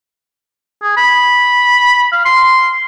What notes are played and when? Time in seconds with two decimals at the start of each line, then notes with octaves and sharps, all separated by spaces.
0.83 G#4
0.97 B5
2.12 F5
2.25 C6